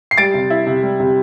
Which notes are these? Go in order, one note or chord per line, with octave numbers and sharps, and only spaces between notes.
C7
G3 A6 D7
C3
E4
C3
G3
C3